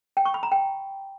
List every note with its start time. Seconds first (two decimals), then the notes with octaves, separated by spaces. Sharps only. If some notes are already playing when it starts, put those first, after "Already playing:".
0.17 G5
0.25 C#6
0.34 B5
0.43 A#5
0.52 G5